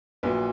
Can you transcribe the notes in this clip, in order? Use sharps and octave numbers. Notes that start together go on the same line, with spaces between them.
A#1 A#2 F#3 B4